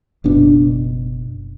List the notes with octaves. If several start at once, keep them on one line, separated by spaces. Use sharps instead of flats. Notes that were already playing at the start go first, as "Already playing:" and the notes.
F#1 B2 D4